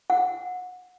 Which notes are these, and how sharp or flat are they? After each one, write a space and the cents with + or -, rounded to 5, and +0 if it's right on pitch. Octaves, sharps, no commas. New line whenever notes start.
F#5 -25